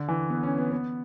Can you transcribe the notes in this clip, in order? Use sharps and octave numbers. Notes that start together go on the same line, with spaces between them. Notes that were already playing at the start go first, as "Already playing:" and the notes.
Already playing: D3
E3
B3
C#4
B3
B3